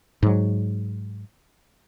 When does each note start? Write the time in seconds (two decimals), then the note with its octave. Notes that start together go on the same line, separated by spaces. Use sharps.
0.23 G#2 F#3